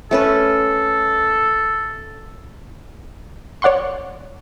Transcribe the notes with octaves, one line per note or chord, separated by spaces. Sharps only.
A3 C#4 A4 B4
C#5 D5 F#5 C6 C#6